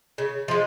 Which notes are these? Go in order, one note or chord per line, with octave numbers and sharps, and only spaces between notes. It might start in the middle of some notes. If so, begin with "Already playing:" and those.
C#3
F3 G#3